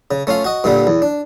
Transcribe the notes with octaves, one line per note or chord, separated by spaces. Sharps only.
C#3
A3 C#4 F4 F5
F#4 D#5
G2 A#2 D3 G3
E2
D4